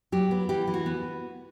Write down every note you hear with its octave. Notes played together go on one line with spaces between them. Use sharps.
F#3 G4
B3
E3 G4
E3
F#4
B3